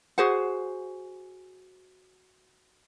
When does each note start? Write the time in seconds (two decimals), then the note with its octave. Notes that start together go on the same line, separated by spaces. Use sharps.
0.18 F#4 G#4 C5 F#5